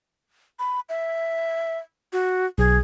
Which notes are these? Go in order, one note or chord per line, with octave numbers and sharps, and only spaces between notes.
B5
E5
F#4
B1 G#4